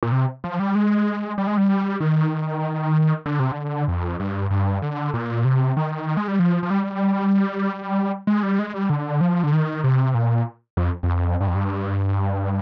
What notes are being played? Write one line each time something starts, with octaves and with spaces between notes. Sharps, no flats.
A#2
C3
F3
G3
G#3
G3
G#3
G3
D#3
D3
C3
D3
F2
G2
G2
D3
A#2
C3
D#3
G#3
G3
F3
F3
G3
G#3
G3
G#3
G3
D3
F3
D3
D#3
C3
A#2
F2
F2
G2
F2
G2